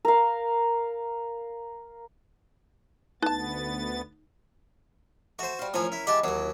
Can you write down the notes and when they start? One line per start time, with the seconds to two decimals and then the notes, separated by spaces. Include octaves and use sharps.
0.05 A#4 F5
3.22 D2 B3 D#4 B4 A5 A6
5.39 A3 F#4 C5
5.59 G3 F5
5.74 A2 F3 C#4 A#4 G#5
5.92 E4
6.07 G#3 E4 G4 F#5 A5
6.24 D#2 C3 E3 F#3